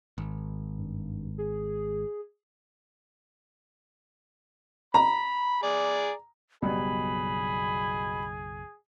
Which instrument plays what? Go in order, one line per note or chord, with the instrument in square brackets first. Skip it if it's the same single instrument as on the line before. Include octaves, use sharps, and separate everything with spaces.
[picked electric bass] G#1
[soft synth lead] G2
G#4
[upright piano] A#5 [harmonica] B5
[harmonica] G#4 D5
[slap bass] F#1 B1 [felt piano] B2 G3 [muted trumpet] G#4 [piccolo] B5